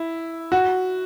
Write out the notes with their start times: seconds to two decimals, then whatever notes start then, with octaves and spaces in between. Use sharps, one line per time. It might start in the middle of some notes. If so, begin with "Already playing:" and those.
Already playing: E4
0.52 F#4